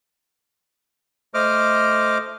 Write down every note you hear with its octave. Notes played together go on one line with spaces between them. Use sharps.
A3 C5 D#5 D6 F6